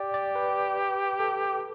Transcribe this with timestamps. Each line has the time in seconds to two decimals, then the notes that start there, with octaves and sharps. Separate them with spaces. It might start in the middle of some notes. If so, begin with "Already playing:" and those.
Already playing: G4 D5
0.14 D5
0.35 B4
1.19 A4